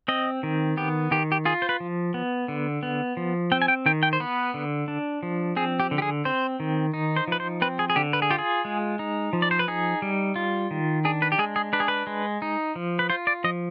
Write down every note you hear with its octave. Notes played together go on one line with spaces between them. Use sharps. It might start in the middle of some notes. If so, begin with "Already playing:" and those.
C4 D#5
D#3
B3 G4
D#3 G4
G4
F4 G#4
C5
B4
F3
B3
D3
B3
F3
C4 G5
G#5
G5
D#3 G5
G5
C5
B3 B4
D3
D4
F3
C4 G#4
G4
D3
G4
G#4
C4 C5
D#3
D#4
C5
F3 B4
C5
C4 B4
G#4
G#4
D3 G4
B4
G#4
F4 G4
G#4
G#3
D#4
F3
D5
C5
B4
D#4 G#4
G3
F4
D#3
D4 G#4
B4
G4
G#3 G#4
G#4
D4 B4
G#4
B4
G#3
D#4
F3
B4
F4 C5
D5
F3 D#5